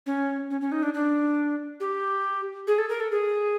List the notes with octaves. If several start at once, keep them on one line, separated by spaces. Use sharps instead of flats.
C#4
C#4
C#4
D#4
D4
D4
G4
G#4
A4
A#4
A4
G#4